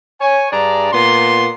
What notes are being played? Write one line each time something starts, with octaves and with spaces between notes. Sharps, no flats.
C#5 G#5
G2 D4 G#4 D5 A#5
A#2 B3 C6